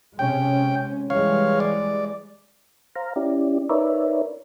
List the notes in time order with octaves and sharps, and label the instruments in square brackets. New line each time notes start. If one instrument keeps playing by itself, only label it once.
[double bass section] C3 G#3 C#4 [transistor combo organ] G5
[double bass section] E3 G3 G#3 [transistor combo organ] C#5 F5
[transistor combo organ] D5
[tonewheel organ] C5 F5 A#5
C#4 E4 G4 D5
D#4 A#4 B4 C#5 D5 E5